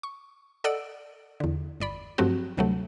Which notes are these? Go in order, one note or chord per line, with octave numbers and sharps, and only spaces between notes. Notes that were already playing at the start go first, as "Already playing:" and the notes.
C#6
A4 D5 D#5 F#5 E6 D7
E2 D3
G1 D5 B5
G2 F3 F#3 A3 C4 F#4
D2 C3 F#3 G3 A3